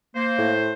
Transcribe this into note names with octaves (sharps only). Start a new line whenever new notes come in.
A#3 C5
A2